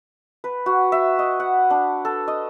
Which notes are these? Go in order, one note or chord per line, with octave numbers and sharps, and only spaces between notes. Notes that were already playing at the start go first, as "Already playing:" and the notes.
B4
F#4
E5
D#5
F#5
D4
A4
D#5